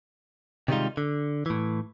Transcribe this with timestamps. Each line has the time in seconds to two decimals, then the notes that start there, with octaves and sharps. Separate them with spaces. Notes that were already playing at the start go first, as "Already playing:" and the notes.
0.68 C3 D#3 G3 G#3 D#4 F4
0.97 D3
1.46 A2 E3